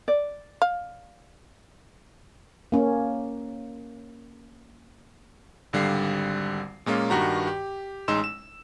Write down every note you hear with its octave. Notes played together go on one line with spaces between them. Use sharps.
D5
F5
A#3 C#4
G#1 D3 G3 F5 C7
A#2 G#3 A#3 C#4 F4
G2 D#3 F#4 G4 A#5
G4
A1 G#3 D#4 C6 E6 E7
E7